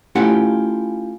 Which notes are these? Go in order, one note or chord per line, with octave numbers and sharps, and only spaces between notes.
A3 C#4 E4 F4 G4 F#5